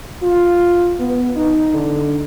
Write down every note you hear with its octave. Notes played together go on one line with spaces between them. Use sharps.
F4
B3
D#4
D3